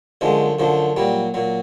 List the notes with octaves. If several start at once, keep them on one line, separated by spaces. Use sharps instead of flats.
F#2 D3 F3 G#3
F#2 D3 F3
A#2 F#3 G3
A#2 F#3